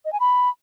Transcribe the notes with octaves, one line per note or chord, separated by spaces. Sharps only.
D#5
G#5
B5